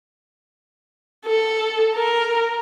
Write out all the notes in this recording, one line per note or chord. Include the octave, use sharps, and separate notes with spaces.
A4
A#4